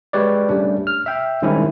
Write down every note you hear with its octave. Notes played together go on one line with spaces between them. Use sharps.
G#3 G4 B4 C#5 D5
G3 A3 C#4 D4
F6
E5 G5
D#3 G3 G#3 C4 C#4 E4